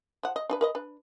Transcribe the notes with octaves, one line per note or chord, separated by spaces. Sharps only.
F3 F#5
D#5
D4 G#4 B4
A#4 B4 D#5
D4 B4